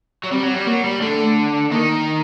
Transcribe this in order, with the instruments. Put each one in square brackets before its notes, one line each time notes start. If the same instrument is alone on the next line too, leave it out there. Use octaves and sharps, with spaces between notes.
[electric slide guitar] F#3
[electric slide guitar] G3 [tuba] C4
[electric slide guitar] F#3
G3
[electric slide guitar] F#3 [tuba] A#3
[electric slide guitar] G3
[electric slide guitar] D3 D4 [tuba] A3
[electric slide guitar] D#3 D#4 [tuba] A#3